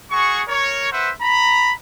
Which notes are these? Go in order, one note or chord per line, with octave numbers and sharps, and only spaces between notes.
F#4 G#4 C#6
A#4 C#5
B4 C5 E5 F#5
A#5 B5